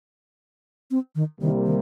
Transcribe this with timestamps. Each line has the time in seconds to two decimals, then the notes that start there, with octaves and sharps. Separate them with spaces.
0.91 C4
1.15 D#3
1.41 C2 C3 D#3 G3 A#3
1.65 D#3